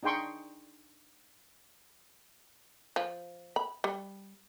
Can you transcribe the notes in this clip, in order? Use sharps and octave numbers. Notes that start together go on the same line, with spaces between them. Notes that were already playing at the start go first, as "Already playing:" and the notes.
D4 D#4 G#4 G5 C6 C#6
F3
B5
G3